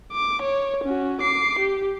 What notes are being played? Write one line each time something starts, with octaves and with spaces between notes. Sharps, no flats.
D6
C#5
C#4 F#4
D6 C7
G4